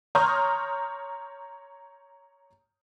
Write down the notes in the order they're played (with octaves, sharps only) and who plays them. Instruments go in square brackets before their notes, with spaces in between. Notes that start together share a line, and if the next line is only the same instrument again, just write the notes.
[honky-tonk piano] C#5 A#5 C6 D#6 F6 G6